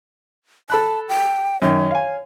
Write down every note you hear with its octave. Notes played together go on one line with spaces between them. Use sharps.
A4 A5 B5 F#6
G5
F#2 D#3 C#5
F5 G#5